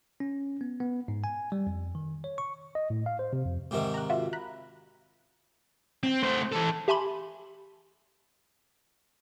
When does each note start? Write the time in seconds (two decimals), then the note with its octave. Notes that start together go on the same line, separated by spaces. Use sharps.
0.20 C#4
0.61 B3
0.80 B3
1.08 G#2
1.24 G#5
1.52 G3
1.67 F2
1.95 D#3
2.24 C#5
2.38 C#6
2.75 D#5
2.90 A2
3.06 F5
3.19 C5
3.33 C3
3.45 F2
3.71 G#2 C3 D#3
3.94 A#5 F#6
4.10 F4 F#4 E5
4.33 A#5 B5 F#6
6.03 C4
6.23 A3 C5
6.52 E3 A4
6.88 G4 E5 G#5 A5 B5 C6